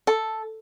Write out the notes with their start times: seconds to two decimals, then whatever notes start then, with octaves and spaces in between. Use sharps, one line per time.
0.07 A4